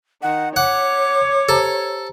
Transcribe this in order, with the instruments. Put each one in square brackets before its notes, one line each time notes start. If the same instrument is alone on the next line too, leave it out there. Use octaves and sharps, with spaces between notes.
[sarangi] D#3 [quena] F#5
[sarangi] C#5 [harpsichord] F#5 [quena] D6
[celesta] G4 C5 A#5 [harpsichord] A4